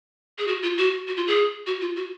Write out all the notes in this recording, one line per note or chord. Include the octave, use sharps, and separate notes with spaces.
G#4
F#4
F4
F#4
F#4
F4
G#4
F#4
F4
F#4